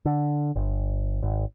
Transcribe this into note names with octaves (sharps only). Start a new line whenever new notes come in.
D3
G1
G#1